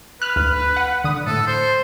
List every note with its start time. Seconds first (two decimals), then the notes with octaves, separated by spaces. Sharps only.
0.22 B4 F6 F#6
0.36 D2
0.77 F#5
1.04 D3 D#6
1.26 A2 A4
1.47 C5